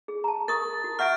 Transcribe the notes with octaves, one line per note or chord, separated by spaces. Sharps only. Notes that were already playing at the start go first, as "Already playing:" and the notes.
G#4
A5 A#5
A#4 C#6 D#6 A6
F#4
E5 F#5 C#6 F6 G6 D7